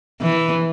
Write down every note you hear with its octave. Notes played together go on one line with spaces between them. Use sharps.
E3